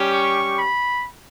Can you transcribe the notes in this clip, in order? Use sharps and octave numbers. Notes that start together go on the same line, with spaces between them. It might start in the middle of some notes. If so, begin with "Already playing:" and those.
Already playing: G3 C#4 G4
C#6
B5